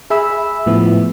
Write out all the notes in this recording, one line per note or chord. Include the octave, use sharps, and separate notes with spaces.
G#4 E5 B5 E6
A2 F3 B3 E4